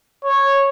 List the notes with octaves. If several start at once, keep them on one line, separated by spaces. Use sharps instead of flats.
C#5